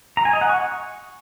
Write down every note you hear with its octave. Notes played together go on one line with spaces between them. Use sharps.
A#5
G#5
D#5
F#5
C#6